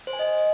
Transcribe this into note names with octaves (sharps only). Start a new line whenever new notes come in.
C5
G#5
D#5